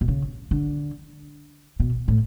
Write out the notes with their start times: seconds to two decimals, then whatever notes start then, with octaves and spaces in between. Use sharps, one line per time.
0.01 B2
0.08 C#3
0.51 D3
1.80 B2
2.08 A2